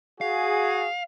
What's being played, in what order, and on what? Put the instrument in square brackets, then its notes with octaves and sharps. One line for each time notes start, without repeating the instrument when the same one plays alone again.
[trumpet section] F#4 G#4 [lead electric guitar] F5